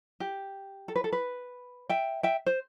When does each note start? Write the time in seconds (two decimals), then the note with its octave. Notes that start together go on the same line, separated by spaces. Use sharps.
0.20 G4
0.88 A4
0.96 B4
1.04 A4
1.12 B4
1.89 E5 G5
2.23 E5 G5
2.46 C5